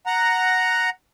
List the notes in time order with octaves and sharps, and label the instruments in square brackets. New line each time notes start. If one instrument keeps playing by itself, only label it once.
[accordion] F#5 A#5